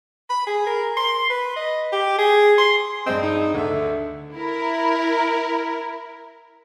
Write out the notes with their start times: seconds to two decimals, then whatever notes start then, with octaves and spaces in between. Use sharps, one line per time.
0.30 B5
0.47 G#4
0.67 A#4
0.97 C6
1.30 B4
1.56 D#5
1.92 G4
2.19 G#4
2.58 C6
3.06 G2 C4 G#4 D#5
3.23 D#4
3.54 D2 D3 E5
4.33 E4 A#4